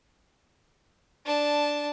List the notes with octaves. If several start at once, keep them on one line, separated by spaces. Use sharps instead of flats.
D4 A5